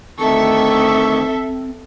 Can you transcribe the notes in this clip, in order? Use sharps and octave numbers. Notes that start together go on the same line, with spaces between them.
D2 D#3 C4 A4 E5 C#6